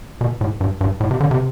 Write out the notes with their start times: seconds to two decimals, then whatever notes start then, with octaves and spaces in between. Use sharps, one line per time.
0.21 B2
0.41 A2
0.61 G2
0.81 G2
1.00 A2
1.11 C3
1.20 D3
1.31 C3